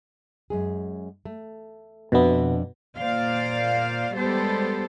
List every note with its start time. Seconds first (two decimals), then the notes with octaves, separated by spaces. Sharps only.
0.50 F#2 G#3 G#4
1.25 A3
2.12 F2 B2 B3 D4 E5
2.97 A#2 A#3 C5 D5 F5
4.14 G3 G#3 B3 G4 A4 C5